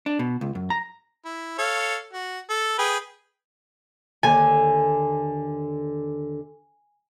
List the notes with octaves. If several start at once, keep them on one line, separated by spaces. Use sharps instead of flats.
D4
B2
C#2
F#2
A#5
E4
A4 C#5 F5
F#4
A4
G#4 B4 G5
D#2 D3 G#5